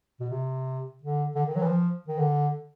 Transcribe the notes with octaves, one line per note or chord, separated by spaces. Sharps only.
B2
C3
D3
D3
D#3
F#3
E3
F3
D#3
D3